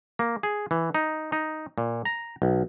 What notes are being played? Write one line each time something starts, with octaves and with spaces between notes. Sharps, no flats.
A#3
G#4
E3
D#4
D#4
A#2
A#5
B1